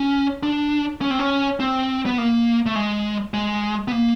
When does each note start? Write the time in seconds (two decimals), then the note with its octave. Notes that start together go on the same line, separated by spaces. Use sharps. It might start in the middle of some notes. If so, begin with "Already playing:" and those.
Already playing: C#4
0.43 D4
1.01 C#4
1.11 C4
1.19 C#4
1.60 C4
2.06 B3
2.18 A#3
2.66 A3
2.76 G#3
3.34 G#3
3.88 B3
3.92 A#3